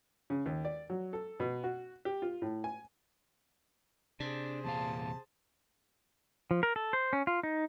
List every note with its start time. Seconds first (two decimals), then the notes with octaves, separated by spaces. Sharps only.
0.30 C#3
0.46 D#2
0.65 D5
0.90 F#3
1.13 A4
1.40 B2
1.64 F#4
2.05 G4
2.22 F4
2.42 A2
2.64 G#5
4.20 C3 D4 G#4 C5
4.65 E2 A#2 F5 A5
6.51 F3
6.63 A#4
6.76 A4
6.93 C5
7.13 C#4
7.27 F4
7.43 D#4